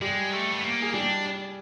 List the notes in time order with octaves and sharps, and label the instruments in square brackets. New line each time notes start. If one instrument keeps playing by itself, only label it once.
[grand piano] G3 G4 [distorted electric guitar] G#3
[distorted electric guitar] A3
B3
A#3
[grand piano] G#4
[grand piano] G3 G4 [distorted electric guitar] D4